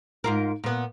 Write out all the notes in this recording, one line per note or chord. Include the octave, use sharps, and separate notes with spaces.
G#2 F4 A#4
A#2 B3